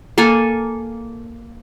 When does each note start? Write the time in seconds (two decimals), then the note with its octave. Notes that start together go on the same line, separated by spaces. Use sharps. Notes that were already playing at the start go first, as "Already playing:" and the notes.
0.18 A#3 A4 G#5